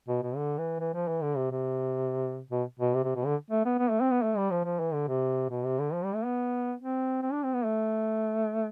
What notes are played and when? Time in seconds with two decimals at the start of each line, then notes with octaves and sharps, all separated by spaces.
0.08 B2
0.22 B2
0.36 D3
0.58 E3
0.80 E3
0.94 F3
1.08 E3
1.22 D3
1.37 C3
1.51 C3
2.50 B2
2.79 B2
2.94 C3
3.04 C3
3.15 B2
3.26 D3
3.51 A3
3.65 B3
3.79 B3
3.90 A3
4.01 C4
4.11 B3
4.22 A3
4.37 G3
4.51 F3
4.64 F3
4.80 E3
4.93 D3
5.08 C3
5.50 B2
5.65 C3
5.79 D3
5.93 F3
6.04 G3
6.15 A3
6.25 B3
6.79 C4
7.22 C4
7.32 D4
7.43 C4
7.54 B3
7.65 A3